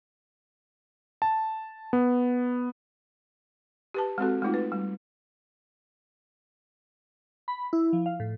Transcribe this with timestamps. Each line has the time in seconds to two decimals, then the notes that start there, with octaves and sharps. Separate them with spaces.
1.22 A5
1.93 B3
3.94 G4 B4 A5
4.18 G#3 C4 F#4 A4
4.42 G#3 A3 D#4 F4
4.54 B4
4.72 G3
7.48 B5
7.73 E4
7.93 F3
8.06 F5
8.20 A2